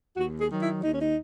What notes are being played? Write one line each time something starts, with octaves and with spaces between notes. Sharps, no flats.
D#2 F#4
G#4
D#3 F#3
E4
D#2 D#4
C#4
D#4